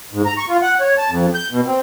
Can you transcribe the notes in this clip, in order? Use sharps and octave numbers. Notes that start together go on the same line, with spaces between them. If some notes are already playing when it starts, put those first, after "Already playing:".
G#2
A#5
C#6
F4
F#5
C#5
A5
F2
G6
B2
C4